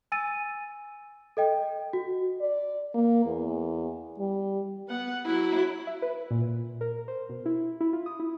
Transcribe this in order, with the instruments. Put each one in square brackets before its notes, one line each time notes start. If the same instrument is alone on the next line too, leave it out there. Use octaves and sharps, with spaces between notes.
[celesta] G#5 E6 A6 D#7
A4 D#5 G5
F#4
[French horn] D5
A#3
E2
G3
[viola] B3 F#5
F#3 E4
[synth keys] E5
B4
A#2
A#4
C5
B2
E4
E4
F4
D#6
E4